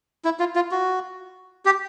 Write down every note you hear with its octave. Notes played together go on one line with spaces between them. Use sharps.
E4
F4
F4
F#4
G4